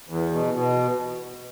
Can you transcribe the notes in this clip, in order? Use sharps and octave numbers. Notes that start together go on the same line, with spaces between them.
E2
B2
B2